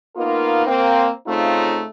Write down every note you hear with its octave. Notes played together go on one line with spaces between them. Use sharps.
A#3 B3 D#4 F4 A#4
A#3 C4
C#3 A3 C4 D#4 F4